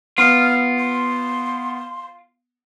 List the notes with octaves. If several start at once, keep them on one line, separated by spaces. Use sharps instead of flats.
B3 F4 F6
C6